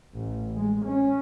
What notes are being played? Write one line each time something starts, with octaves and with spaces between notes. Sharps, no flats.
A1
G#3
C#4